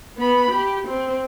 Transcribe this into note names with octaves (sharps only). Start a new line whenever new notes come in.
B3 B5
G4
C4